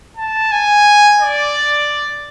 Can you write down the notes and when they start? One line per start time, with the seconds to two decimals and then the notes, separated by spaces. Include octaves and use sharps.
0.17 A5
0.52 G#5
1.21 D5